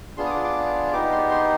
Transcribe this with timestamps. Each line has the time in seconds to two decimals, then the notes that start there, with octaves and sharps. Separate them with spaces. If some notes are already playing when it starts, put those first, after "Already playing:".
0.17 B3 D4 F4 G#4 C6
0.26 D#6
0.30 D6
0.43 D6
0.92 B3 D#4 G4 D6
1.12 C6
1.30 C6